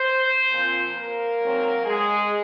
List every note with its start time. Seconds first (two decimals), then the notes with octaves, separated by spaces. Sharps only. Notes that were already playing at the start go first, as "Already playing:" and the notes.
Already playing: C5
0.52 A#2 F3 C4
0.96 A#3 A#4
1.41 G#2 F#3 C4
1.86 G#3 G#4